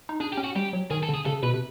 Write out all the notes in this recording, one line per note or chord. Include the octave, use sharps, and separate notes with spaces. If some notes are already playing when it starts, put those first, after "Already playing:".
D#4
D4 G#4
G4
C#4
F#4
G3 G4
F#3
D#3 G#4
A4
D3
G#4
C#3 A4
B2 B4
C3